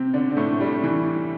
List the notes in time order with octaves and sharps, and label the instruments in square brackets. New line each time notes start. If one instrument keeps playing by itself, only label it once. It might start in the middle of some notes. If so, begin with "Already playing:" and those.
Already playing: [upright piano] C3 C4
D3 D4
C4
A2 A3
G3
E3